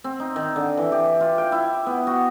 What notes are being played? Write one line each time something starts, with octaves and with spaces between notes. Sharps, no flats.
C4
D#4
D#3
D3
E3
G4
F4
G5
E4
B3
F#4